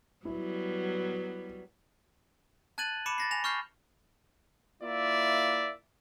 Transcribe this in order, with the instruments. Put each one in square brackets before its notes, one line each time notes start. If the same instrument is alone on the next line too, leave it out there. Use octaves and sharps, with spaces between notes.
[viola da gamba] F#3 G3 B3 [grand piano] E4
[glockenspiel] A5 F#6 G#6 A6 D#7 F#7
B5 D6 C#7 E7
A6 A#6 C7
G#5 A#6 F7
C#6 F6 G6 A#6 C7
[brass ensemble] A#3 E4 F4 D5 E5